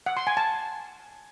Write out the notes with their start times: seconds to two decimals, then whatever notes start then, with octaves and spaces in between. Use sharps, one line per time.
0.06 F#5
0.17 C6
0.27 G#5
0.37 A5